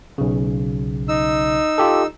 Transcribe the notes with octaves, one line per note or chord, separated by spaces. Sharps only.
B1 C#3
D#4 E6
F4 G4 A4